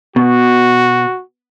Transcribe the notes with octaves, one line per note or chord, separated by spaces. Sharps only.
B2 F#4